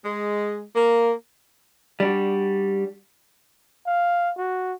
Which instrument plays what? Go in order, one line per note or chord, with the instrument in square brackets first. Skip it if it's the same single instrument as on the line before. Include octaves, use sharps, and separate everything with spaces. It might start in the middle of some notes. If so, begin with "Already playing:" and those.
[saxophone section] G#3
A#3
[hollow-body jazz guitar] G3 D4 F#4
[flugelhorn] F5
F#4